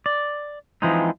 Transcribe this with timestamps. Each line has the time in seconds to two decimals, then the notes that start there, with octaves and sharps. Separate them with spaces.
0.06 D5
0.82 E3 F3 G#3 C4 D#4